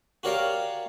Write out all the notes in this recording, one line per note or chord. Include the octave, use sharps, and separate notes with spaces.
F#4 G4 A#4 C#5 D5 F5